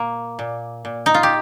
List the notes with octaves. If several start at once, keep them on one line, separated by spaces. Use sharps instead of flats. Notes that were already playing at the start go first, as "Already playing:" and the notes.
Already playing: A#2 A#3
A#2
A#2
D#4
F4
G4